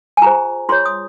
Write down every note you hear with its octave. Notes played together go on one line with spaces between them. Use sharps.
G#5
F4 G#4 C5 A#5
F4 G#4 C#5 C6
D#6